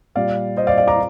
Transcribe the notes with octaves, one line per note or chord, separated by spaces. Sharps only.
A#2 G3 D5 F5
C5 D#5
D5 F5
D5 F5
A#5 D6